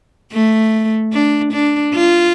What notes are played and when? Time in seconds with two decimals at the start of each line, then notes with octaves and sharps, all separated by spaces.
0.32 A3
1.13 D4
1.53 D4
1.94 F4